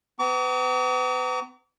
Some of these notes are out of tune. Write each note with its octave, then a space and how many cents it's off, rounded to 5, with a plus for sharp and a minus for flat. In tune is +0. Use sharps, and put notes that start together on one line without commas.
B3 +40 A#5 -30 D6 -45